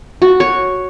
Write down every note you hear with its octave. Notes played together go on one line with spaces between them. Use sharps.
F#4
C#5